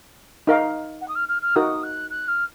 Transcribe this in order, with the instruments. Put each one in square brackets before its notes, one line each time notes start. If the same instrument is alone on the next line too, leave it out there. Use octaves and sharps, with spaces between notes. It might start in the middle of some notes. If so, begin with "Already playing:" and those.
[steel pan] D#4 A#4 F5
[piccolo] F#5
D#6
F6
F6
F6
[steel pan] D#4 F#4 A#4 [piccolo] D#6
[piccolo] F#6
F#6
F6